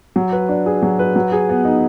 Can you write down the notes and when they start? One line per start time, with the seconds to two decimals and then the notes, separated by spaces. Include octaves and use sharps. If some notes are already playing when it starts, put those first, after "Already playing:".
0.16 F#3
0.32 B4
0.49 D4
0.66 G#4
0.82 F#3
0.99 B4
1.16 F#3
1.32 G#4
1.49 B3
1.65 D#4